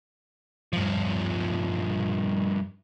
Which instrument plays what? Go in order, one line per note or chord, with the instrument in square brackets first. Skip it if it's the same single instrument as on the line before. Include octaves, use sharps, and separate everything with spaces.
[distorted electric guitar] G2 F3